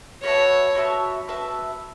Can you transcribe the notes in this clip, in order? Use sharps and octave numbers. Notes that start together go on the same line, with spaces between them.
F#4 B4 C#5 E5 A5
F#4 B4 E5 A5
F#4 B4 E5 A5